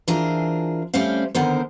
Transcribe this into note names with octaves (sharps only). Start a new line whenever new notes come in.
E3 D4 F4 G#4 A#4 C5
G3 A3 C4 C#4 C5 F5
D3 D#3 B3 C4 A#4 C5